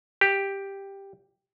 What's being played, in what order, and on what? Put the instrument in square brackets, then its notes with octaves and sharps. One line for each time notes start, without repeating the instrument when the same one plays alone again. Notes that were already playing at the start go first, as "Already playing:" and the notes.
[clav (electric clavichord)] G4